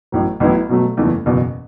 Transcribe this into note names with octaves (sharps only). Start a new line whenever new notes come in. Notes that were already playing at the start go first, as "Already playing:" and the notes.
A1 A2 F#3
A1 A2 F#3 B3 E4
B2 F#3 A3
F#1 E2 E3 A3
F#1 E2 B2